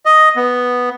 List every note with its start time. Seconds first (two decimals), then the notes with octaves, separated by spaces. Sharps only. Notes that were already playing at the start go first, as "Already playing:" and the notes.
0.06 D#5
0.36 B3